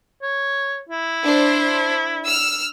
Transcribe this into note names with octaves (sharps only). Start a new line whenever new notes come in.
C#5
E4
D4 C5
E6 F6